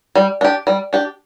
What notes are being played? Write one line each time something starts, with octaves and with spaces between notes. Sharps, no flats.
G3
D4 G4
G3
D4 G4